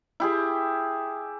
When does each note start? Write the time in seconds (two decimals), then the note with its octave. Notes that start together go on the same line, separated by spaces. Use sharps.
0.20 E4 G4 G#4